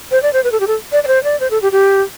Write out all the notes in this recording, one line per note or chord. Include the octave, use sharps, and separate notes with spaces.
C5
D5
C5
B4
A4
G4
A4
D5
D5
C5
D5
C5
A4
G4
G4